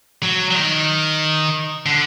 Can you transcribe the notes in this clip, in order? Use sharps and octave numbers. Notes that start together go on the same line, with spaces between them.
F#3
F#3
D#3
D3